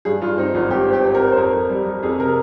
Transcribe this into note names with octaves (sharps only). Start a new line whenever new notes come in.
G2 G#4
G2 F4
C4 D#4
G#1 F4
G#1 G4
C4
G4
C4
A#4
C4
C5
F2 A#4
F2
G3
G3
F2 G#4
C3 A#4